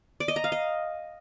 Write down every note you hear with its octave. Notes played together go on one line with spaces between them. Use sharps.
D5
D#5
A#5
F5
D#5